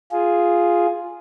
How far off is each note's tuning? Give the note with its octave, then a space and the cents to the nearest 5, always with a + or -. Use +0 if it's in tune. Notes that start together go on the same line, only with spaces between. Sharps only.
F4 +0 G#4 +0